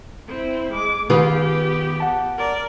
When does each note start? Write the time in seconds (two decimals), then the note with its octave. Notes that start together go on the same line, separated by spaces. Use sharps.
0.28 C4 E4
0.73 G#3 D6
1.10 D#3 B3 F4 G4 G#4 B4
2.00 F#5 A5
2.37 A#4 D5